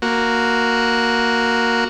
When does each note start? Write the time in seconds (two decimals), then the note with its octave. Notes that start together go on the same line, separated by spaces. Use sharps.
0.02 A#3 F#4